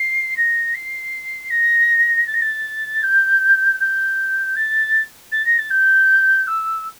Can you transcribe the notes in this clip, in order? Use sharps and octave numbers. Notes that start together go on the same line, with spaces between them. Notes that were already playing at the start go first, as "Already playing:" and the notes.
Already playing: C7
A#6
C7
A#6
A6
A#6
A6
G6
G6
A6
A6
A#6
A6
G6
E6